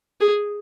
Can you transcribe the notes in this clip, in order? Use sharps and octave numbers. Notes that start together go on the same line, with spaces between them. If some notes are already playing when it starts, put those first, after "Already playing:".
G#4